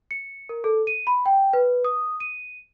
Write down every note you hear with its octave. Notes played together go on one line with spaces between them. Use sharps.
C#7
A#4
A4
D#7
B5
G5
B4
D#6
D#7